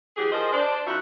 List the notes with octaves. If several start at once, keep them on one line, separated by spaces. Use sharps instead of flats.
E3 F#3 G4 G#4
F3 G#4 A#4 C5 D#5
D4 C5 D5
F#2 D#4 F4 F#4 E5 F#5